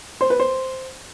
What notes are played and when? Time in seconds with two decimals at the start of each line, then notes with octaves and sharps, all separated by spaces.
0.21 C5
0.30 B4
0.40 C5